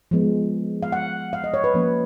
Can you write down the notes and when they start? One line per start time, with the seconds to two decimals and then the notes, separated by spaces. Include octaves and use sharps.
0.11 F3 G#3 B3
0.83 F5
0.92 F#5
1.33 F5
1.44 D#5
1.54 C#5
1.64 B4
1.74 F3 A#3 C#4